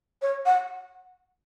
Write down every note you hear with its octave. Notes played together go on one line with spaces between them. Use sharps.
C#5
F#5